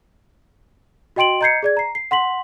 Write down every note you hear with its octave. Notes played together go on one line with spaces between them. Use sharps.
F#4 D#5 G5 C6 D7 F#7
D#5 A#5 G6 G#6 C7 C#7
G#4 D5 G#6
A#5 C7
C7
F#5 C6 B6 F#7